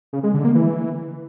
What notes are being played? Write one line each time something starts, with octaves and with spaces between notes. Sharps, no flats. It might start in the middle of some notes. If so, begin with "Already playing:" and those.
C#3
G#3
D3
A#3
E3